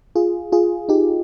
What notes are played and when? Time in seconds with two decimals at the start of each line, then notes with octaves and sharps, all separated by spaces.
0.15 F4 G#4
0.52 F4 G#4
0.89 D#4 G4